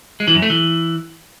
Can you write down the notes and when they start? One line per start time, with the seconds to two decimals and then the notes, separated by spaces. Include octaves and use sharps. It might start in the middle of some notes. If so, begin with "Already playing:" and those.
0.20 G#3
0.28 E3
0.35 F#2
0.42 A3
0.50 E3